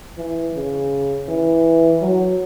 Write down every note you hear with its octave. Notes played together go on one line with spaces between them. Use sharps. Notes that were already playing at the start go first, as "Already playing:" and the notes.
E3
C#3
E3
F#3